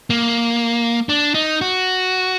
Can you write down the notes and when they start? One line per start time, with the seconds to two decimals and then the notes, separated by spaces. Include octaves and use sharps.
0.10 A#3
1.09 D4
1.34 D#4
1.61 F#4